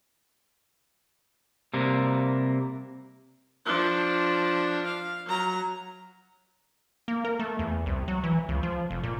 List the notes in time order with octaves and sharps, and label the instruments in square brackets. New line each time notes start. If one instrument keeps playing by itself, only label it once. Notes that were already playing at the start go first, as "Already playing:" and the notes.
[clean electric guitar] C3 G3 A#3
[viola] F3 D4
F5
F#3 A#5
[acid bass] A#3
A#4
A3
E2
C2
F#3
E3
C#2
F3
F1
A#2